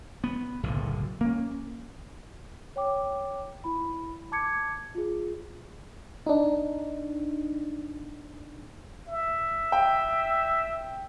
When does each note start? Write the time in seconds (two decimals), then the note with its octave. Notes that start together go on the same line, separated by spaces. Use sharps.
0.24 B3
0.63 F#1 B1 A2 D3
1.21 A#3 C#4
2.76 C#5 G5 D6
3.64 E4 B5
4.32 A5 D6 G#6 C#7
4.95 F4 G#4
6.26 D4 D#4
9.08 E5
9.72 G5